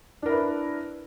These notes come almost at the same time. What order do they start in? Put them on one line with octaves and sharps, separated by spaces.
D4 A#4 E4 B4